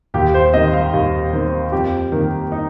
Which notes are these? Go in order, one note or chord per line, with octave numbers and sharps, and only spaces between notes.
D#2 G4
C5
D#3 C4 D#5
F5
D#2
D#3 C4
F2 G4
D#3 A#3
D#4